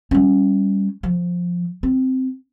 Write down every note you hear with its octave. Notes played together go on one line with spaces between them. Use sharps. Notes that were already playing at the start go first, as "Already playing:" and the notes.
G3 C#4
F3
C4